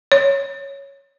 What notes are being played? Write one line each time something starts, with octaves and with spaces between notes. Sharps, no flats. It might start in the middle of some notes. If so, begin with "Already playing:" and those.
C#5